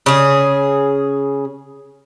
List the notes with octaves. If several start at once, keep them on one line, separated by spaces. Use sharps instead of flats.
C#3 G#4